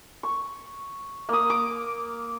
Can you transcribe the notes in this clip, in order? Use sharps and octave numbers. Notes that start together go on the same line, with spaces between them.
C#6
A#3 D#6
D6